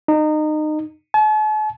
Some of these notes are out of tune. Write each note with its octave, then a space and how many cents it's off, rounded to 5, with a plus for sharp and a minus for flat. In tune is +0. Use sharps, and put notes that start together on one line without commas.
D#4 -25
A5 -45